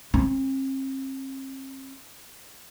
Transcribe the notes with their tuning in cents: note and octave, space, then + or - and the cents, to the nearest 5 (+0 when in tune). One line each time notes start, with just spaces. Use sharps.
C4 +40